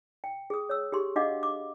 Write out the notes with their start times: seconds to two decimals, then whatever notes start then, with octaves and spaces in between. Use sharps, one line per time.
0.24 G5
0.50 G#4 D#6
0.69 C#5 E6
0.92 G4 G#4 C6
1.16 D4 F#4 D#5 F5 F#5 D6
1.43 D6